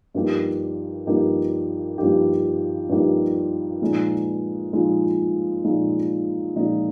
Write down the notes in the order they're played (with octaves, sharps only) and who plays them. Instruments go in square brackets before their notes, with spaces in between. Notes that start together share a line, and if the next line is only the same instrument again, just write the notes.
[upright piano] G2 F3 A#3 D#4 G4
G2 F3 A#3 D#4 G4
G2 F3 A#3 D#4 G4
G2 F3 A#3 D#4 G4
A#2 F3 G#3 D#4
A#2 F3 G#3 D#4
A#2 F3 G#3 D#4
A#2 F3 G#3 D#4